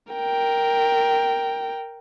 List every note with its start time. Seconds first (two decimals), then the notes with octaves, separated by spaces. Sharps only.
0.13 A#4 G5